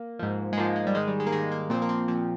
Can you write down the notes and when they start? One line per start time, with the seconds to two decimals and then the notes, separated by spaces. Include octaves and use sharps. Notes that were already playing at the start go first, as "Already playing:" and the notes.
Already playing: A#3
0.19 G#2 F3
0.53 G#3
0.57 G#2 F3 A#3
0.76 G#3
0.87 G3
0.95 G#2 D#3 G#3
1.08 G3
1.20 G#3
1.26 A#3
1.32 G#2 D#3 G#3
1.52 A#3
1.70 A#2 F3 C4
1.82 A#3
1.89 C4
2.08 A#2 F3